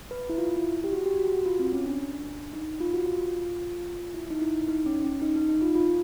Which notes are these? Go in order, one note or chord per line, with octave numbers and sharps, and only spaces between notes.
B4
E4
F4
E4
G4
F#4
G4
F#4
F#4
F4
C4
C#4
D4
D#4
F4
F#4
F4
E4
D#4
E4
D#4
C#4
C#4
D#4
D#4
D#4
F4
F4